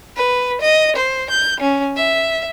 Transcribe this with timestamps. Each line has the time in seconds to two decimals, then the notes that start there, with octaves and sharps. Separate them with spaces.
0.16 B4
0.61 D#5
0.96 C5
1.30 G6
1.60 C#4
1.97 E5